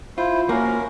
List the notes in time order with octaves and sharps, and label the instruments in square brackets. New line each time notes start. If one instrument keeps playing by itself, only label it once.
[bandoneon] E4 C5 [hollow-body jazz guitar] F4
[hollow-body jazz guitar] A#3 F#4 [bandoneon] C#4 A#4